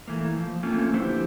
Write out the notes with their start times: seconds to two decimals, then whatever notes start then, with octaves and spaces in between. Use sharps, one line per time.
0.08 E3 A3 A#3
0.37 F3
0.63 A3 A#3 C4 C#4 F4
0.93 D3 F3 E4 G4 B4 C5